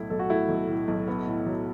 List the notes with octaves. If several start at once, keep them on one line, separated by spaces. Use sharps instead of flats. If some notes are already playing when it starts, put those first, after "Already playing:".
Already playing: B1 A2 A3 E4
B1 A4
F#4
A3 E4
B1
A2
B1
B3
A2
F#3